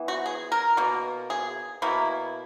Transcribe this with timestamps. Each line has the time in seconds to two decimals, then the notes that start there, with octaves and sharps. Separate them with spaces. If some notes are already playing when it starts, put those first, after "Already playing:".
Already playing: E3 B3
0.08 F#4
0.26 G#4
0.52 A#4
0.77 B2 A#3
1.30 G#4
1.82 B2 A#3 E4